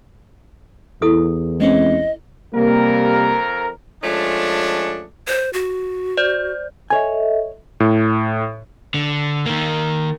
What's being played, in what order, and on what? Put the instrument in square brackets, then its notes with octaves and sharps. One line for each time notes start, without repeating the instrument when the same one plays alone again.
[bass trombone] E2 [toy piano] E4 A4 D#6
[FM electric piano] G#3 C4 C#4 [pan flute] D#5
[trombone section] F2 A#4 [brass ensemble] C3 G3 A#3
[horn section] F3 G#3 A3 C#4 D4
[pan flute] C5
F#4
[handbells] C5 D5 G6
[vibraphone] A4 D#5 E5 [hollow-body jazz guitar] C#5 G#5
[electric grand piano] A2
[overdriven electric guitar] D3
D#3 A#3